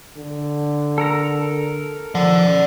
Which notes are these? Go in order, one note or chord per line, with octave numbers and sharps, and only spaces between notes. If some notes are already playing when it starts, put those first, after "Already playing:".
D3
A4 A#4 A#5
F3 D5 F#5